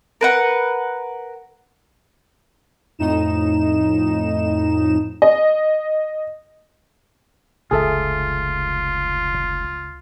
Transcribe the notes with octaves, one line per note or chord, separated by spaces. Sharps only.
A#4 B4 F#5
F2 A2 D#4 E7
D#5
F1 C#2 F4 G#4 A4 E5